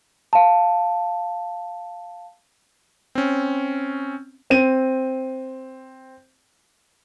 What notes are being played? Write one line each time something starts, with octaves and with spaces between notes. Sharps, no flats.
F5 A5
C4 C#4
C4 D#7